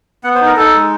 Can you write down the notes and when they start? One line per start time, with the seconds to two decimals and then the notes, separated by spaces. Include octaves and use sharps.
0.24 B3 F#5
0.35 C5
0.41 D#4
0.46 A#4
0.57 D#4 A4
0.74 G#3